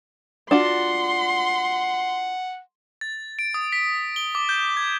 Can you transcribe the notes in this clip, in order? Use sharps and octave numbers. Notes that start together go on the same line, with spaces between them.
D4 F4 F#4 F#5 C6
A6
D7
D#6
B6
G7
D6
G6
G#6